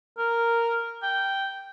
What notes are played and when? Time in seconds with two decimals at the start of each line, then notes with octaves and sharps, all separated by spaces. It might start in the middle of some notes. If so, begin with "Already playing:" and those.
0.18 A#4
1.03 G5